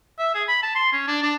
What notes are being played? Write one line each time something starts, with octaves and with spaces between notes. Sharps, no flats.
E5
G#4
B5
A5
C6
C#4
D4
D4